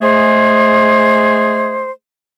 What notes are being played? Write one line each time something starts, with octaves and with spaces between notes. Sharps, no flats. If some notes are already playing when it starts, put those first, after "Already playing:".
G#3 A3 G#4 C5